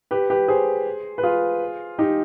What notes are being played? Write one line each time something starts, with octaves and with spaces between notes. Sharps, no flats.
G4 B4
G4 B4
G#4 C5
B4
F4 G#4
D#4 G4